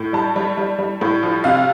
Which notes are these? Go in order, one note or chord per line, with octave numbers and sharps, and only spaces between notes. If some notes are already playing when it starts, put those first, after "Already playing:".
Already playing: A2
G3 A5
G3
G3
G3
A2
F3
C3 F5